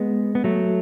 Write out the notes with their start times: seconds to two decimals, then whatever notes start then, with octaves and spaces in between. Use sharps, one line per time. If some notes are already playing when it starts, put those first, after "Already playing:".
Already playing: G#3 B3
0.35 B3
0.44 F#3 A3